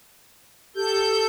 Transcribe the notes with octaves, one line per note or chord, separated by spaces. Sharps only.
G4 A4 G6